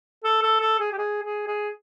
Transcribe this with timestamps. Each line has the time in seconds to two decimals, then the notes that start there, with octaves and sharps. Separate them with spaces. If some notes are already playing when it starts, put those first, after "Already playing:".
0.24 A4
0.43 A4
0.61 A4
0.80 G#4
0.92 G4
0.98 G#4
1.23 G#4
1.47 G#4